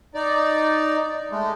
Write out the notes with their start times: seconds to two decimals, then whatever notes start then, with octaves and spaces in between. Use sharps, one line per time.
0.15 D#4 D5
1.31 G#3 A3